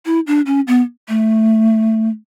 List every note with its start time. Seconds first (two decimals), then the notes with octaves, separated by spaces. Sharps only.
0.06 E4
0.27 D4
0.46 C#4
0.67 B3
1.09 A3